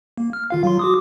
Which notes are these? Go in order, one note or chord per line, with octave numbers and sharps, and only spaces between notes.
A#3
F6
D#3 F4 F5
F#3 F4 C6
F#4 D6 D#6